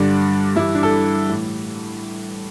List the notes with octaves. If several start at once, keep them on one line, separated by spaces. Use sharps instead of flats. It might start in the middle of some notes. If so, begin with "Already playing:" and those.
Already playing: G2 D3 D4
G2 E3 E4
D4
A4
A2 E3